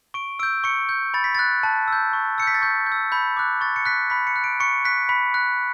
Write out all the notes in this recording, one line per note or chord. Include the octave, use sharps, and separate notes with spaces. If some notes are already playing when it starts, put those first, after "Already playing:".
C#6 D7
E6 G6 D7
C#6 C#7
G6
B5 A6
B6
F#6 A6
A5
E6 G6
C#6
E6 G6 B6 C#7
A6
C#6 G6
G6
E6
B5 G6
D6 F#6
C#6 A6
C#7
F#6 B6
B5 B6
C#7
F#6
D7
C#6 C#7
F#6 B6
B5 B6
F#6